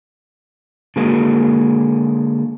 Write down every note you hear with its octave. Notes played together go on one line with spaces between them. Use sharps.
D3 G#3 A#3 F#4 G#4 A#4